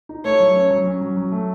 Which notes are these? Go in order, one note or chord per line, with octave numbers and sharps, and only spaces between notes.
D#4
A3 C#5
F#3
C#4
F#3
C#4
F#3
F#3
A3